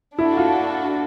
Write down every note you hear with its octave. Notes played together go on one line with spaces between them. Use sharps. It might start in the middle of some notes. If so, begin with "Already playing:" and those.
D4 E4 F#4 A4
F4